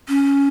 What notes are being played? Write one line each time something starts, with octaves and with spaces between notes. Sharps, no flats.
C#4